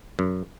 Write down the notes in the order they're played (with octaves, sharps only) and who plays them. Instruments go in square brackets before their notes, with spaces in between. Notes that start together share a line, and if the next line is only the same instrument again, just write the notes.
[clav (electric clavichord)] F#2